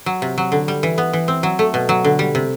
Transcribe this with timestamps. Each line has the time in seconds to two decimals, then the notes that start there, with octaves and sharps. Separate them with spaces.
0.06 F#3
0.22 C3
0.38 F#3
0.52 D3
0.68 G3
0.83 E3
0.98 B3
1.13 E3
1.28 C4
1.43 F#3
1.59 A3
1.74 B2
1.89 F#3
2.04 D3
2.19 G3
2.35 C3